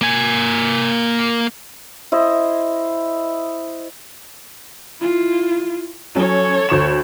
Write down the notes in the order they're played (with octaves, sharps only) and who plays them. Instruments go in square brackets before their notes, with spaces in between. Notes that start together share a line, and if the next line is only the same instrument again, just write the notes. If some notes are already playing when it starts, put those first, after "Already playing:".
[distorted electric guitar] A#3 G#5
[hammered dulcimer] E4 C5 D#5
[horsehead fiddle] E4 F4
[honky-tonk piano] F#3 C#4 [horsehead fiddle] A4 C#5
[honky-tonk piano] D2 C#6 E7